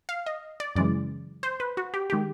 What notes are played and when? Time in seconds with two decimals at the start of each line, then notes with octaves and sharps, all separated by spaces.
0.09 F5
0.26 D#5
0.60 D5
0.76 F#2 C#3 E3 G#3 D5
1.43 C5
1.60 B4
1.77 F#4
1.94 G4
2.10 D#3 G#3 G4